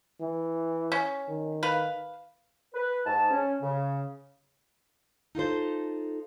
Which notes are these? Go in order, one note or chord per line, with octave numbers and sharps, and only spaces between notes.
E3
C#4
D#3
B4 F5
B4
G#2 A5
C#4
C#3
D#4 F4 A4 C5